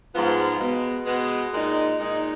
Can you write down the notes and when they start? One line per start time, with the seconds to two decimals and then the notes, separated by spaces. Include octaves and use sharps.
0.14 G#2 F3 B3 F4
0.59 B2 G#3 B3
1.06 B2 G#3 B3
1.53 A#2 G#3 D#4
1.99 A#2 G#3 D#4